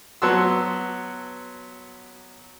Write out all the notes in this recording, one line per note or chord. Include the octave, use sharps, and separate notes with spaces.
F#3 B3 F#5 A5 C6 E6